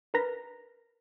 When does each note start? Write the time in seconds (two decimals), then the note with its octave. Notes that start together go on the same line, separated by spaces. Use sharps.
0.14 A#4 B4 A#5 A#6 B6